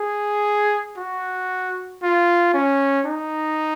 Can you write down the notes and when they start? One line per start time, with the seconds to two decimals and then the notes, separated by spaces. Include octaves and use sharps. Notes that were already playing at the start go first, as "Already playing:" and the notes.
Already playing: G#4
0.97 F#4
2.02 F4
2.54 C#4
3.06 D#4